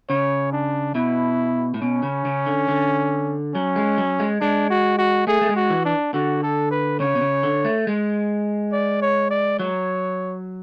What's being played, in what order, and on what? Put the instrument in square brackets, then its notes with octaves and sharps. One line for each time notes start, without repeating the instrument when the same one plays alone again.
[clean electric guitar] C#3 [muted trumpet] C#5
[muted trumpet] D4
[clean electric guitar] B2 [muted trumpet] E4
[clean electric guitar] A2
[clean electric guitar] B2 [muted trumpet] C#4
[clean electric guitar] C#3
C#3
D3
D3
[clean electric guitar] F#3 [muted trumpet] C#4
[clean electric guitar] G#3
F#3
G#3
[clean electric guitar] G#3 [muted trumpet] D4
[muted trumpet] F#4
F#4
[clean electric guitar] A3 [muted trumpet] G#4
[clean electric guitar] A3
G#3
[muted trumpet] F#4
[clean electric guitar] E3
[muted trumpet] D4
[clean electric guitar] D3 [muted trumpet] F#4
[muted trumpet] A4
B4
[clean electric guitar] C#3 [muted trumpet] C#5
[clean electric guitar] B2
C#3
D3
A3
G#3
[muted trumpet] D5
C#5
D5
[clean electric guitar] F#3 [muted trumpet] C#5